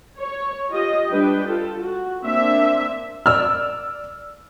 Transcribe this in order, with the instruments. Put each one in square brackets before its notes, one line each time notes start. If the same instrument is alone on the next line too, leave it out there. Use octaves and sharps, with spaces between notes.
[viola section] C#5
F4 G4 D#5
G3 D4 B4 G5
F4 A4
F#4
A#3 C4 D4 E5
[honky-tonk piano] D5 E6 F6